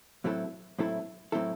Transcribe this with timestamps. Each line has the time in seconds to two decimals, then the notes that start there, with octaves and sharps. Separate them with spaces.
0.24 A2 F#3 C4 E4 A4
0.79 A2 F#3 C4 E4 A4
1.32 A2 F#3 C4 E4 A4